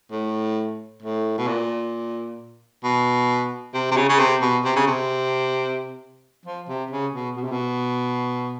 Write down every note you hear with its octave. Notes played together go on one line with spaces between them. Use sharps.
A2
A2
B2
A#2
B2
C3
C3
C#3
C#3
C3
B2
C3
C#3
C3
F3
C3
C#3
B2
B2
C3
B2